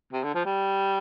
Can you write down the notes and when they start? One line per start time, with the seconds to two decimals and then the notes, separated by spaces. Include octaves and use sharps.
0.13 C3
0.23 D3
0.34 F3
0.45 G3